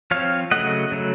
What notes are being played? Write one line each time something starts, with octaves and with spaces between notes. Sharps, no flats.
F3 C4 C#5 F5
C#3 F#3 A3 D#5 F#5
C#3 F#3 A3